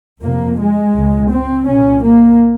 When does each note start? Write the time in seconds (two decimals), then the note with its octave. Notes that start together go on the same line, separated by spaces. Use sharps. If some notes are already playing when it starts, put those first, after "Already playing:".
0.21 F2 C3 A#3
0.58 G#3
0.94 C#2 C#3
1.31 C4
1.67 C2 A#2 C#4
2.04 A#3